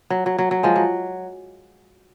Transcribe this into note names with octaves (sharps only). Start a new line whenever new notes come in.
F#3
F#3
F#3
F#3
F3 G#3
F#3